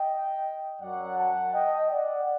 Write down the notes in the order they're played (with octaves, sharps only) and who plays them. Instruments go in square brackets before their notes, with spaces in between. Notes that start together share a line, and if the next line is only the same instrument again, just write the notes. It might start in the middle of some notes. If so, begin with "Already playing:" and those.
Already playing: [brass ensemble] D#5 G5
F#2 F#3 D5 F#5
F#5 A5
D#5 G5
D5 F#5